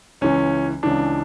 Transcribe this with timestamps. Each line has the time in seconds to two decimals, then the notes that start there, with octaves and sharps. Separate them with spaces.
0.21 C#2 C#3 E3 C#4
0.83 C#2 C#3 E3 D4